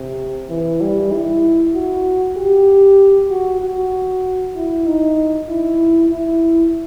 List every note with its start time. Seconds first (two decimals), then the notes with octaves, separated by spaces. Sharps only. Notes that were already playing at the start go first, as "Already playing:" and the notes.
Already playing: C3
0.50 E3
0.81 G3
1.12 E4
1.74 F#4
2.37 G4
3.30 F#4
3.61 F#4
4.55 E4
4.87 D#4
5.49 E4
6.11 E4